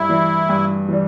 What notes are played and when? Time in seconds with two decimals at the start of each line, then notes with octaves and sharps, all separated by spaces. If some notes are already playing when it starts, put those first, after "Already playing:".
Already playing: G2 E4
0.09 E3 G3
0.49 G2
0.88 E3 G3